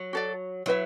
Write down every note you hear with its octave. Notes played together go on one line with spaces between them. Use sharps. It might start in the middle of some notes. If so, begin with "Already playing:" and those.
Already playing: F#3
F#4 A4 D5
F#3 E4 B4 E5